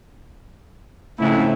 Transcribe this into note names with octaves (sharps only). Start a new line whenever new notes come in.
F2 G#2 C#3 A3 E4